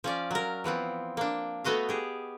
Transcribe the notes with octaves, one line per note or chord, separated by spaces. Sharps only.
F3 C#4 D5
F#3 A#4
E3 F3 B3 C4
A#3 D4
A3 B3 F#4 D#5 F5
G4 G#4